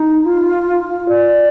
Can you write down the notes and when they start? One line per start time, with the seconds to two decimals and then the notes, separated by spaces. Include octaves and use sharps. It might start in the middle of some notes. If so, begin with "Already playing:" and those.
Already playing: D#4
0.25 F4
1.09 D5